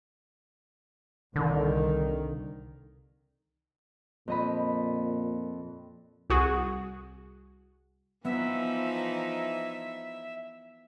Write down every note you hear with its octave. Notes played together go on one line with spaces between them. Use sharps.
C2 D3 D#3
F2 A#2 D#5 B5
C2 F#4 G#4
E3 F3 B3 D#4 E5 E6 B6